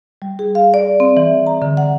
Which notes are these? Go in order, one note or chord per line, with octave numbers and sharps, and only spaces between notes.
G3
G#4
F5
D5
C4
E3
A#5
D3
F#5